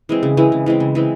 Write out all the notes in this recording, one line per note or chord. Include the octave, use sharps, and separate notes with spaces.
E3 G#3 C4
C#3
E3 G#3 C4
C#3
E3 G#3 C4
C#3
E3 G#3 C4